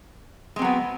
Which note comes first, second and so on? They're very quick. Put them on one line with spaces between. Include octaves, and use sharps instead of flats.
G#3 C4 F#3 B3